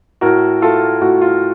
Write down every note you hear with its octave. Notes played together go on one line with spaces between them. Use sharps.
A2 F#4 A#4
A3 F4 A4
A2 F#4
F4